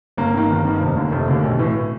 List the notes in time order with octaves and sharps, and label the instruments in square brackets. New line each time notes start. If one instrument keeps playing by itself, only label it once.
[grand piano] G1 A#3
G2 D#3
G1
G2 D#3
F1
D#2 D3
F1 A3
D#2 D3
B1
A2 E3